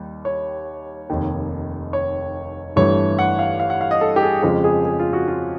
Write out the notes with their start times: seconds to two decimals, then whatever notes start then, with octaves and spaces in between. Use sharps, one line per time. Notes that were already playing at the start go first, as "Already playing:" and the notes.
Already playing: D#2 D#3 G3
0.25 C#5
1.10 F1 D#2 D#3
1.93 C#5
2.76 G1 G2 E3 A3 C#5
3.19 F#5
3.39 F5
3.60 F5
3.70 F#5
3.81 F5
3.91 D#5
4.01 A4
4.16 G4
4.23 G#4
4.43 F2 C#3 F3 G#3 C#4 G4
4.64 G#4
4.85 G#4
4.99 F4
5.13 F#4
5.28 F4